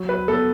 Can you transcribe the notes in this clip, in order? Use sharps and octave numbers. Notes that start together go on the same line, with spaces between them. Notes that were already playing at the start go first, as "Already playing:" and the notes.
Already playing: F#3
B4
B3 A4